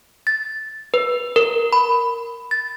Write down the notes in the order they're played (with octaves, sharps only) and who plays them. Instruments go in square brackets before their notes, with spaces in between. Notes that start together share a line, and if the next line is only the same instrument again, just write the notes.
[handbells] A6
B4
A#4
B5
A6